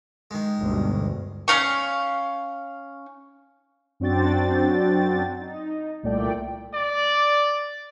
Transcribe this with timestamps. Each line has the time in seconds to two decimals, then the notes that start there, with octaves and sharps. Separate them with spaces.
0.31 D#3 G#3
0.62 G1 D2 B2
1.48 C#4 D#4 F5 C#6
4.00 F#2 C4 D4 F#4 G5 A6
5.41 D#4
6.03 C2 A#2 A3 D5 G5
6.75 D5